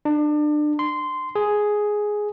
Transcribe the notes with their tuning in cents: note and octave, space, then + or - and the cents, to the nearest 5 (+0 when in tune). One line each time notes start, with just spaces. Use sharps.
D4 +30
C6 -10
G#4 +5